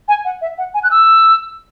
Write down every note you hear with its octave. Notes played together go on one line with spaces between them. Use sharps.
G#5
F#5
E5
F#5
G#5
F#6
E6